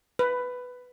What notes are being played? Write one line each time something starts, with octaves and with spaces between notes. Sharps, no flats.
B4